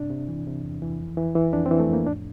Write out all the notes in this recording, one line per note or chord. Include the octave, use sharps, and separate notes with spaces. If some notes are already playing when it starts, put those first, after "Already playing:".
Already playing: G2 C3 D4
C3
E3
C3
E2
E3
F2
E3
E3
F2 D4
C4
E3
A3
F2 A#3
A2 D4